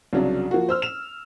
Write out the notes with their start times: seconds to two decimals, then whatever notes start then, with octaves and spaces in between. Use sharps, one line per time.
0.13 C2 C#3 F#3 D4
0.51 F3 A#3 F#4
0.69 C5 E6 F6
0.82 E7 F7